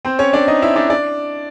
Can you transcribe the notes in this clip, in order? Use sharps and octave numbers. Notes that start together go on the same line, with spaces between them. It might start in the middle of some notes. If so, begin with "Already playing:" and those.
C4 C5
C#4 C#5
D4 D5
D#4 D#5
E4 E5
D4 D5
D4 D5